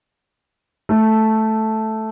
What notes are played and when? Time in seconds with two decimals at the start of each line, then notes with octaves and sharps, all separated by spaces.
0.89 A3